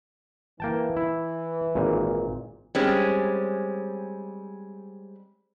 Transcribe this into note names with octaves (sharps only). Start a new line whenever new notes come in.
E3 A#3 G5 A5
E4
G#1 A#2
G3 G#3 C4 C#4